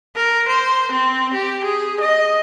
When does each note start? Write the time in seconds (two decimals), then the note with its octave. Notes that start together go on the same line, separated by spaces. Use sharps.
0.15 A#4
0.48 C5
0.91 C4
1.33 G4
1.64 G#4
2.01 D#5